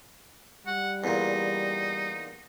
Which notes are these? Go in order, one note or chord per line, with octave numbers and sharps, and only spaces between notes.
G3 F#5
E2 A#2 D#4